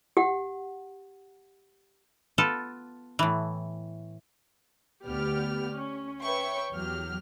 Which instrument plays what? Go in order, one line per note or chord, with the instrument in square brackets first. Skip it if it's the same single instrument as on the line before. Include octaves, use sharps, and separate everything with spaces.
[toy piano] G4 F#5
[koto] B3 F4 A4 A5
A2 E3
[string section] D2 B3 G4 D5 F6
C#4
B4 C#5 E5 G5 C#6
E2 F#3 G4 F6